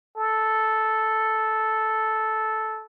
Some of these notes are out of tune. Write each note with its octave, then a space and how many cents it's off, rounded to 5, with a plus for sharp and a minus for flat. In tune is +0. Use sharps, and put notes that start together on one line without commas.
A4 -5